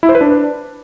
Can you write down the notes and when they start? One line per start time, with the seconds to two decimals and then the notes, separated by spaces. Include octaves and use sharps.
0.03 E4
0.09 C5
0.15 B4
0.21 D4